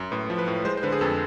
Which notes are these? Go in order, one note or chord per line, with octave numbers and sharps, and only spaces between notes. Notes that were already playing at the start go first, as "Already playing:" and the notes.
Already playing: F#2
A2 B4
F3
B4
A2
G#3 C5
C5
D3 B4
G#4
F2 A4